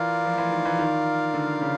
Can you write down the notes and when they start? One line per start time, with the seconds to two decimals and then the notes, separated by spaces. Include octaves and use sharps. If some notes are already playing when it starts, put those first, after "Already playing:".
Already playing: E3 F4 A#4 D5 F5
0.25 F3
0.38 E3
0.52 D#3
0.65 E3
0.79 D#3
1.34 D3
1.61 C#3